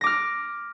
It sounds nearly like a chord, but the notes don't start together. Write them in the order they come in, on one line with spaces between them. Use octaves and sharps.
A#6 D6 F6